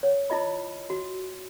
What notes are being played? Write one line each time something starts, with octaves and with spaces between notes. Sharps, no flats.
C#5
E4 F4 D#5 B5
F#4